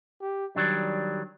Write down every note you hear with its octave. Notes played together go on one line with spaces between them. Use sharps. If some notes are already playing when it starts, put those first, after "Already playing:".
G4
D#3 F#3 G3 D4